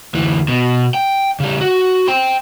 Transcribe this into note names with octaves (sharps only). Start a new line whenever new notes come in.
D2 E3
B2
G5
C#3 G3
F#4
G5 C6